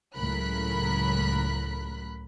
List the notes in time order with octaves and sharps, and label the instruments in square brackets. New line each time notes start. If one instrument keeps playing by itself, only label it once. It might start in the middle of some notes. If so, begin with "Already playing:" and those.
[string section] C#2 A2 F#3 A#4 B5 F#6